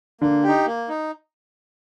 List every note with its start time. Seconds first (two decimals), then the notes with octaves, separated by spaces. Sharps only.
0.21 D3 A#3
0.43 D#4 G4
0.66 A#3
0.88 D#4